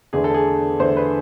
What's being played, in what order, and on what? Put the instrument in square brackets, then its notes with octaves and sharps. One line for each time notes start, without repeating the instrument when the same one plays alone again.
[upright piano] E2 D3 A3 G#4
A4
G#4
E2 D3 A3 C5
B4